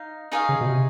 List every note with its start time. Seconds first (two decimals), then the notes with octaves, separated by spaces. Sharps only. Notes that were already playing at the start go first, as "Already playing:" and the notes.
Already playing: D#4 F5
0.32 D#4 G#4 C#5 F5
0.49 C#3
0.61 B2
0.66 C3